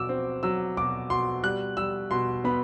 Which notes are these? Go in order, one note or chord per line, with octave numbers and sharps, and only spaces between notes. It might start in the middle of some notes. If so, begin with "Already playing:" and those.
Already playing: B2 F#3 D6 E6
C4
F#3 E6
B2 D6
B2 C6
G3 F#6
G3 E6
B2 C6
B3 B5